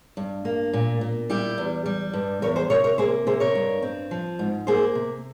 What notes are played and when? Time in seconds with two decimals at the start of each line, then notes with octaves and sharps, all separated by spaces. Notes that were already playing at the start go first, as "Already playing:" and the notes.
0.17 G2
0.45 A#3
0.73 A#2
1.01 A#2
1.30 G3 E4 G4
1.58 E2
1.86 G3
2.13 G2
2.42 E2 A#4 C#5
2.56 G#4 C5
2.70 C3 A#4 C#5
2.84 A#4 C#5
2.98 A#3 G#4 C5
3.27 C3 G#4 C5
3.40 A#4 C#5
3.55 G2
3.82 C4
4.11 F3
4.39 G#2
4.67 A#3 G#4 C5
4.95 C3